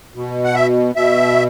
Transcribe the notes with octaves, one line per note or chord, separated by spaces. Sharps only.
B2
F#5
E5
B2 E5